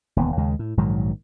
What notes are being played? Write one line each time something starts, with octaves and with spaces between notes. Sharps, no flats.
E1 D#2 B3
D#2 C#3 G#3
A2
A#1 G#2 D#3 F#3